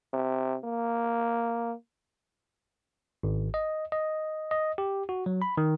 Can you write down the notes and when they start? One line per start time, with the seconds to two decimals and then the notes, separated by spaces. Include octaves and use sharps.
0.13 C3
0.64 A#3
3.23 G#1
3.54 D#5
3.92 D#5
4.51 D#5
4.78 G4
5.09 F#4
5.26 F#3
5.42 B5
5.57 D#3